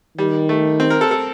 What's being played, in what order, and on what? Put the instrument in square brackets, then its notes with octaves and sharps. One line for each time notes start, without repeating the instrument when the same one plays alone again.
[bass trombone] D#3 [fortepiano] G3
[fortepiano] A3
C4
A#4
A4
A4